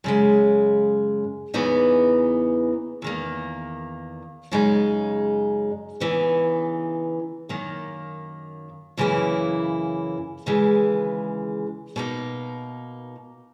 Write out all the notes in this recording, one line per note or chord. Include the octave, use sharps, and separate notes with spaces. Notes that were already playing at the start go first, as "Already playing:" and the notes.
F#2 C#3 G#3
E2 C#3 E3 B3 D#4
E2 D#3 A#3
F#2 C#3 G#3 D#4
C#3 E3 B3 D#4
F#2 D#3 A#3
F#2 C#3 E3 A#3 E4
D#2 C#3 E3 G#3
B2 A#3 D#4